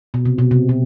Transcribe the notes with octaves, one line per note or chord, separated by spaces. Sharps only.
B2
C3
B2
C3
B2